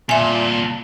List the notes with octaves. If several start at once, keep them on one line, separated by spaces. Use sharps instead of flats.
C2 A#2 A4 E5 G#5